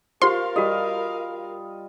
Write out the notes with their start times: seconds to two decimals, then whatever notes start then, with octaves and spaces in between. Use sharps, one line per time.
0.22 F4 G4 A#4 C5 F5 C6
0.56 G3 F#4 G4 A4 D#5